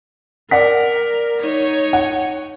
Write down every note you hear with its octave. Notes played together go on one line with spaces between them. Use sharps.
A#4 D5 F#5 B6
D#4 C#5
F#5